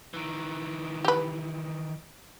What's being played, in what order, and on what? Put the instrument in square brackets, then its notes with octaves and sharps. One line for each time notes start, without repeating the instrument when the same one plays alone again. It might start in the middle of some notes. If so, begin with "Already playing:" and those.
[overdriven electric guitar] D#3 E3
[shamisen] G4 B4